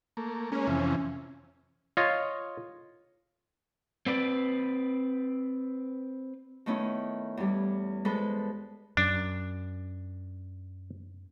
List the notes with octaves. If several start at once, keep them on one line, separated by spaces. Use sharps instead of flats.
A3 A#3
G#3 A#3 C#4
F2 C3 E3
F4 C#5 D#5
C4 B4 D5
D#3 A3 B3 C#4 E4
E2 G3
G#3 B3 A4 B4 C5
F#2 D4